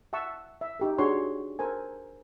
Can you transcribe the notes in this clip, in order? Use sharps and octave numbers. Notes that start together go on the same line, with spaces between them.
E5 F#5 A5 C#6 E6
E5
D#4 G4 A4
D4 F#4 G#4 C#5 C6
A4 A#4 C5 G#5